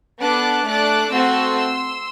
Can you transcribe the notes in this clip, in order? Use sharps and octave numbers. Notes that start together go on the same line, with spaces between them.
B3 D4 A4 D6 F#6
A3 D4 A4 D6 F#6
A3 C4 F#4 A4 C6 E6